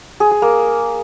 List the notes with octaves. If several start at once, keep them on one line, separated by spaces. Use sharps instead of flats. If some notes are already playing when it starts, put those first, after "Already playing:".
G#4
G#4
A#3